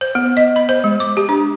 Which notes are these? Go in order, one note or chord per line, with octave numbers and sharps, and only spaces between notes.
C5
B3
D#5
B5
C5
G#3
D6
G4
D4